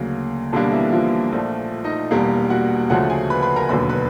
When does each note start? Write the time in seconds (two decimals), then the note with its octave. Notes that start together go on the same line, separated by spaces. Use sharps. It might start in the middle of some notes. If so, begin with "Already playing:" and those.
Already playing: D2 C#3 F#3 A#3
0.52 B1 B2 D3 G3 A#3 D4
0.72 E3 E4
0.92 F3 F4
1.31 A#1 A#2 F3 A3
1.84 D#4 D#5
2.11 E1 E2 B2 G3 A#3
2.50 F#4 F#5
2.90 D2 C#3 F3 A3 F#4 F#5
3.09 G#4 G#5
3.30 B4 B5
3.42 B4 B5
3.56 A#4 A#5
3.69 E1 D#2 D3 F#3 B4 B5
3.89 B4 B5